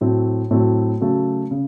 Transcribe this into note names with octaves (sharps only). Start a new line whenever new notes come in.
A2 F#3 A3 C4
A2 F#3 A3 C4
C#3 F#3 A3
C#3